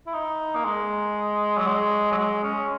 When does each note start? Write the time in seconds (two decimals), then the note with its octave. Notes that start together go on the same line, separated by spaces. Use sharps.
0.07 E4
0.14 D#4
0.56 A#3
0.65 G#3
1.57 F#3
1.67 G#3
2.12 F#3
2.18 G#3
2.43 C#4